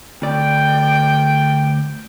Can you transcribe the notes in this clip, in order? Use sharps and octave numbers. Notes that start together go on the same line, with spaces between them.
D2 D5 G5